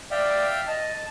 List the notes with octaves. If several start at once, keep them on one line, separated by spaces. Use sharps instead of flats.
D5 E5 F5 G5
D#5 A5